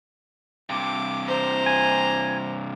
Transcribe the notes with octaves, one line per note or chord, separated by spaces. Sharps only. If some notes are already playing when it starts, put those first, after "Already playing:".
G2 C3 D6
C5 A#5
G#5